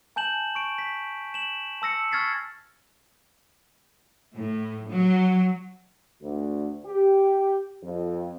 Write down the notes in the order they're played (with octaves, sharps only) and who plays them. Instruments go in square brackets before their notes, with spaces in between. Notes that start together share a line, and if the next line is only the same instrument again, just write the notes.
[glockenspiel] G#5 A5 G6 E7 F#7
C#6 D7
B6
E7 F#7
A5 E6 A#6 C#7
C#6 F6 G#6 A6 B6 C7
[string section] A2
F#3
[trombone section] D2
G4
F2